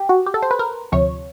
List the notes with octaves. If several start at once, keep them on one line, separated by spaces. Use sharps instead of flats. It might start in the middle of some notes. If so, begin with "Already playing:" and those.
Already playing: G4
F#4
G4
A4
C5
B4
A#4
D2 C3 F3 C#5